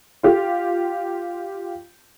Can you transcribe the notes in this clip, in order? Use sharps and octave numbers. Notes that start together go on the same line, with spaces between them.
F4 G4